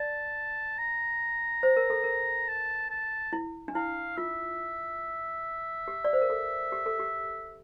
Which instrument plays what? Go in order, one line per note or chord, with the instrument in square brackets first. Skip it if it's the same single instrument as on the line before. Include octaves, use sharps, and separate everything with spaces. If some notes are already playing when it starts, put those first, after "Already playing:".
Already playing: [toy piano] D5 [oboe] A5
[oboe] A#5
[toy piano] C5
A#4
A4
A#4
[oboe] A5
A5
[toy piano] E4
D4
[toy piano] E4 [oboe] F5
[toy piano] F4 [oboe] E5
[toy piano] G4
D5
C5
A#4
A4
G4
A4
G4